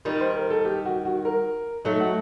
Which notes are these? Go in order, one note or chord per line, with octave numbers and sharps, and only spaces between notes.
D#3 G3 D#4
C5
A#4
A4
G4
F#4
F#4
A#4
F#3 A3 D#4
F#4